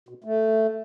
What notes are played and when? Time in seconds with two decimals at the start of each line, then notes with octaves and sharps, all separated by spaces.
0.09 B2
0.24 A3